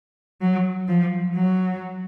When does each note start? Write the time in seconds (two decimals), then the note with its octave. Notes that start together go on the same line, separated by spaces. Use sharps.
0.41 F#3
0.88 F3
1.35 F#3